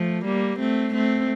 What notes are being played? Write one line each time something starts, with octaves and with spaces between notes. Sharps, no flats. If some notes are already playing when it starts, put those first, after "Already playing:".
Already playing: F3 A3
G3 A#3
A3 C4
A3 C4